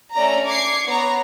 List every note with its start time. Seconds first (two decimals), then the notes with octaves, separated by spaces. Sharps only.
0.14 A3 C#4 D5 A#5
0.48 D6 G#6 C7 C#7
0.86 B3 C#5 A#5